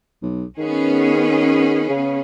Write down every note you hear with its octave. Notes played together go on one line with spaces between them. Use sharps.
B1
D#3 B3 C#4 G#4
C#3